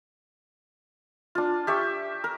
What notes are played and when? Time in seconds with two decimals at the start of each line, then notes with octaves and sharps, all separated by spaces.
1.35 D4 F4
1.67 G4 E5 C#6
2.24 A#4